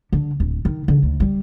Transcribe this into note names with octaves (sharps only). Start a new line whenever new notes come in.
D3
D1
D#3
D3
D2
G3